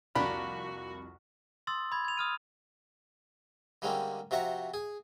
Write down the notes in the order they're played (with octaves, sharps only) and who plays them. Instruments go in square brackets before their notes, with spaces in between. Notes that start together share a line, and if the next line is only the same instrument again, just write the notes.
[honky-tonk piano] C2 F2 [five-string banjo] A#3 D4 G4 [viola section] F#4 [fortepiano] B5
[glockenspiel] C6 D#6 E6 A6
B5 G#6
G#6 F7
D#6 F6 D#7
[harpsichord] D3 G3 G#3 A#3 C4 C#4
C3 F3 F#4 E5 A#5 C#6
G#4